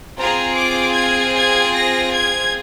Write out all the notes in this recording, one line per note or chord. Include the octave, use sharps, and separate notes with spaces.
C4 F4 G#4 A#5
D6
G#6
G#6
A#6
G#6